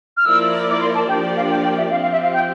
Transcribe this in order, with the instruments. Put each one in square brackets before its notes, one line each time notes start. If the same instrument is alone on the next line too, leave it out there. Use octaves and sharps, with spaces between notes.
[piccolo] F6
[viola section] F3 A#3 E4 A#4 D5 [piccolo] E6
[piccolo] D6
C6
A5
[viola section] F3 A#3 D4 G4 D5 [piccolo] G5
[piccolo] G5
F5
G5
G5
E5
[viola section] F3 C4 G4 [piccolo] F5
[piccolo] F5
E5
F5
G5